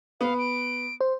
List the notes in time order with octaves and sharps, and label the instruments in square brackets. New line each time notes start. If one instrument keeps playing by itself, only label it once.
[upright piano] B3 [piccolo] F5
[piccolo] D7
[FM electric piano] C5